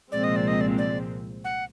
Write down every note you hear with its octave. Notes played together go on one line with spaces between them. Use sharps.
C2 A#2 F3 G#3 C4 D5
D#5
D5
D#5
D5
D5
F#5